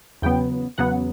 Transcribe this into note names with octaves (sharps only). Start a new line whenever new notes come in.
E2 C#3 F#3 B3 G5
E2 C#3 F#3 B3 F#5